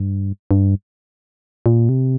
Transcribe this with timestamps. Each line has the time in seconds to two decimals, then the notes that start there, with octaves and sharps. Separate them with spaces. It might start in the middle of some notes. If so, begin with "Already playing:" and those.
Already playing: G2
0.51 G2
1.66 A#2
1.89 C3